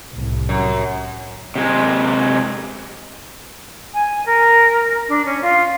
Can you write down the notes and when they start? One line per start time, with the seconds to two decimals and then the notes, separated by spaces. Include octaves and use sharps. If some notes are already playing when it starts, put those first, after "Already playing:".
0.14 C2 A2
0.49 F#2
1.55 C3 G#3
3.94 G#5
4.25 A#4
5.08 D4
5.25 C#4
5.41 F4